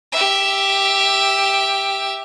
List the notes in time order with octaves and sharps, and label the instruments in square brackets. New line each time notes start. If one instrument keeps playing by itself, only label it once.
[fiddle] G4 E5